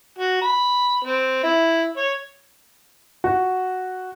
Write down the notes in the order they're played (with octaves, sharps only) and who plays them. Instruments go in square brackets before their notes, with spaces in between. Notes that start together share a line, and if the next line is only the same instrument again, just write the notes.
[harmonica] F#4
B5
C4
E4
C#5
[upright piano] F#4